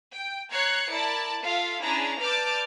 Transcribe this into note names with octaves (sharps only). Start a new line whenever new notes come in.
G5
C#5 A#5 F#6 G#6 C7 C#7
E4 A#4 D5 A5
F4 A4 E5 F5
C#4 D4 E4 G#4 A5 A#5
B4 D5 A5 D6 F6 G6